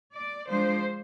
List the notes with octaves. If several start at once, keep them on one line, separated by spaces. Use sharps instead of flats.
D5
F3 G#3 D4 C5